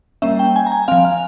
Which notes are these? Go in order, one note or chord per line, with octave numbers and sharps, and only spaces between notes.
G3 A#3 C#4 E5
G5
G#5
A#5
G#5
F3 C4 F5
F5